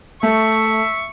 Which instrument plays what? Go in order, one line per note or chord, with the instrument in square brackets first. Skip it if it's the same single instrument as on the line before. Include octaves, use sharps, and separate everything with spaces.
[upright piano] A3 [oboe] E5 [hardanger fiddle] C#6